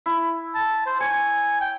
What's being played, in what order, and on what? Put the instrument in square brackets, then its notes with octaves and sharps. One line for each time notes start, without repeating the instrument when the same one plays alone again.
[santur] E4
[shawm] A5
C5
[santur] C#5 [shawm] G#5
[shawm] G5